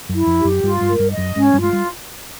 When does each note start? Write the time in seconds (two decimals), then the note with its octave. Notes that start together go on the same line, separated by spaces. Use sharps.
0.09 F#2 F#3
0.14 E4
0.26 F2 F3
0.39 G4
0.44 F#2 F#3
0.63 G2 G3 F4
0.81 G2 G3
0.88 G#3 A#4
0.99 G2 G3
1.12 D#5
1.17 F#2 F#3
1.36 G#2 G#3 C#4
1.54 G2 G3
1.60 G#3 F4
1.73 G3